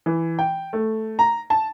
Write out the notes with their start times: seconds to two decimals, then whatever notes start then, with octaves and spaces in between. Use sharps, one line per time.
0.06 E3
0.39 G5
0.73 A3
1.19 A#5
1.50 A5